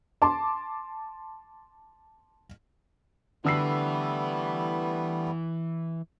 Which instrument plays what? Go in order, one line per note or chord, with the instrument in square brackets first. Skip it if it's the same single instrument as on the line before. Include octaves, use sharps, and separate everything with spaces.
[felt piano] A5 C6 D6
[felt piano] D3 E6 C7 [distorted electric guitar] E3 [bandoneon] G3 A3 B3